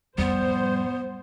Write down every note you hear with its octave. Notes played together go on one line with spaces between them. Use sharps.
F2 A2 G3 B3 C5